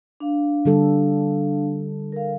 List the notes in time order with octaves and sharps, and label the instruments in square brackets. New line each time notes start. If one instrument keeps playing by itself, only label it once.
[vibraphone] D4 F5
[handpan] D3 G3 A4
[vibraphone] A#4 F5